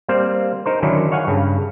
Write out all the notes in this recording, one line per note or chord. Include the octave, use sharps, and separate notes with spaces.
G3 A#3 C4 C5 F5
D#4 A#4 C5
D3 D#3 F#3 C#4 E4
C#5 F5 F#5 G#5
G2 C#3